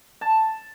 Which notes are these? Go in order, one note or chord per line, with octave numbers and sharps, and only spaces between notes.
A5